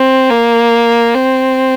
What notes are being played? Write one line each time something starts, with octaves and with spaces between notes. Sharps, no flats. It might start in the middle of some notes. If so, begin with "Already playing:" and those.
Already playing: C4
A#3
C4